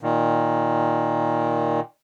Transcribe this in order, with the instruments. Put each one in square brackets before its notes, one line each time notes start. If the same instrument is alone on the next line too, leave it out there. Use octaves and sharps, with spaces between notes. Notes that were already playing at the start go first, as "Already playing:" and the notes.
[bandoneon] A#2 D#3